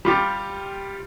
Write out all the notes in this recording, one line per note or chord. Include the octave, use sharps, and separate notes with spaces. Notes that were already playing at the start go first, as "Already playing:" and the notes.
G3 F4 G4